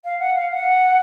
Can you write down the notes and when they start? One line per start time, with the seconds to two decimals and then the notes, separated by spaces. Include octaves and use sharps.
0.04 F5
0.19 F#5
0.35 F5
0.51 F#5